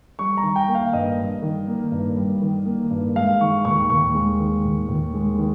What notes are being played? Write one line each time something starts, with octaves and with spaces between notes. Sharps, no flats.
G3 C#6
A#5
D#3
G5
A#3
F5
G2 D#5
G3
D#3
A#3
G2
G3
D#3
A#3
G2
G#3 F5
D#3 C#6
D#2 C#6
D#2 C#6
G#3
D#3
D#2
D#2
G#3
D#3